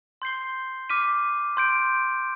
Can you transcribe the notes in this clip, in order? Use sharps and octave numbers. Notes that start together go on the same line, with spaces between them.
C6 G6 C7 G7
D6 F6 B6 D#7
C6 G6 D7